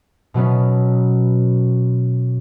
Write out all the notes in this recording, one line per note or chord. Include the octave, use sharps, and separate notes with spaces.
B2 F#3 B3 C#4